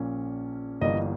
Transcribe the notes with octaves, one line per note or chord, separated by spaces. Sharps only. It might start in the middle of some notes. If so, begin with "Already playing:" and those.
Already playing: A#1 A#2 A#3 C#4
G1 G2 E3 A#3 D#5